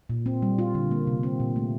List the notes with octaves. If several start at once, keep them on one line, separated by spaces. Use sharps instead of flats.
A#2
C4
G3
F4
D3
A#3
C3
C4
A#2
A3